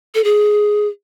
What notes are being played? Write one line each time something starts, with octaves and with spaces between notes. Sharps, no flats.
A4
G#4